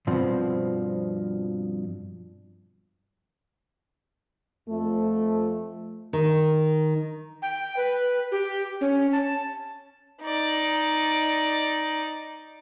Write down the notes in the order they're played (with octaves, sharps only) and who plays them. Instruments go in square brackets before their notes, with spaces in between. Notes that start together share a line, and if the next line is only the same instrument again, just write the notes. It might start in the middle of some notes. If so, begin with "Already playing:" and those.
[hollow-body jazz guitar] G2 B2 F3 C4
[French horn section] F2 F3 A3
[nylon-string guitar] D#3
[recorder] G5
B4
G4
C#4
A5
[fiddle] D#4 D5